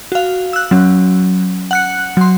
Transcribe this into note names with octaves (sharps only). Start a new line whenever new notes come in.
F#4 F5
E6 F#6
F#3 C#4
F#5 F#6 C#7
F#3 C6